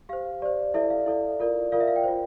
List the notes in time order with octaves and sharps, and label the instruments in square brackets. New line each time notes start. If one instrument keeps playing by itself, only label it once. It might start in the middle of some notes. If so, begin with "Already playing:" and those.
[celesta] G4 C5 F5
G4 C5 D5
E4 A4 D5 E5
F5
E4 A4 D5
F4 A#4 D5
F4 A#4 D5 F5
E5
F5
G5
F4 C5